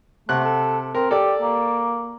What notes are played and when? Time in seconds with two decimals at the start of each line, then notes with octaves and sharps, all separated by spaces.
0.29 C3 A3 F#5 F#6
0.44 A4
0.95 C4 A#4
1.11 G4 A4 D5
1.42 A#3